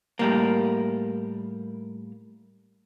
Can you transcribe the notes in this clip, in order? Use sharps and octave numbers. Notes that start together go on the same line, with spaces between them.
A2 G3 A#3